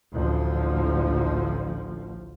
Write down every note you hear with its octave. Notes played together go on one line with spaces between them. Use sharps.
A1 D2 F3